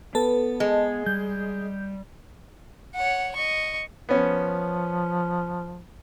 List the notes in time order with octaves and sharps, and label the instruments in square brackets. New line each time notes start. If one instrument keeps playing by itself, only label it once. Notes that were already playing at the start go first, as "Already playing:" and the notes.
[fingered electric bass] B3 [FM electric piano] A4 B4 A5
[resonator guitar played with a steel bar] G#3
[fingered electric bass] G3 [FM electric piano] G6
[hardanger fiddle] C#5 F#5
D#5 C#6
[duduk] F3 [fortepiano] B3 C#4